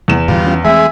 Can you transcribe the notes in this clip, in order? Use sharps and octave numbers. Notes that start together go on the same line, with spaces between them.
E2 E7
G#2 D3 E3 G3 F4
E3 C#4
E3 G#3 A3 C4 G#4 E5